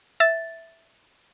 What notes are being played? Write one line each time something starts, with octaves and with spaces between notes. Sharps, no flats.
E5 A6